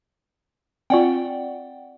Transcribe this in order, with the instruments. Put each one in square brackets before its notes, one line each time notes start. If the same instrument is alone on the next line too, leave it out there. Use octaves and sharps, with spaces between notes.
[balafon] C4 F4 [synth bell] D5 F#5 G5